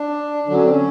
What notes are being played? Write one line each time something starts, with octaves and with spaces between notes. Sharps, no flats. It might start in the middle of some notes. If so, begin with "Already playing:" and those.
Already playing: D4
D3 F#3 D4
C#4
C4
C#4